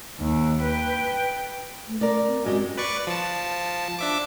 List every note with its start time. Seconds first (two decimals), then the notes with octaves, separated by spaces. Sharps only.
0.20 D#2
0.62 B4 G5
1.88 A3
2.01 A3 A#4 D5
2.27 C4
2.44 F#2 G#3 F#4 G4
2.78 B4 D5 C#6
3.07 F3 A5
3.99 D4 E5 D6